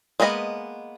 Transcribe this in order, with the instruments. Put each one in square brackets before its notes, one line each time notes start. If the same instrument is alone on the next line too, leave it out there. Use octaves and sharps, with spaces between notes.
[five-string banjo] G#3 A#3 B3 D#5 B5